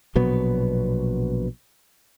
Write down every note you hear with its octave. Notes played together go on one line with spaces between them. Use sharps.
A#1 B2 F#3 B3